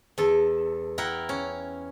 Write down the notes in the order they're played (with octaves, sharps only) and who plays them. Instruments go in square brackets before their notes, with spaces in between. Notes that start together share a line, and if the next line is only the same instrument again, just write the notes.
[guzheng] E2 A4
E4 A#4 F#5 G5
C#4